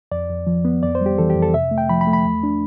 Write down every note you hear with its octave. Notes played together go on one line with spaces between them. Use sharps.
F2 D5
F2
F3
B3
F2 D5
C5
G3 G4
E3 A4
G4
F2
A4
C3 E5
A3
G5
F3 B5
B5
A3
B5
E2
D4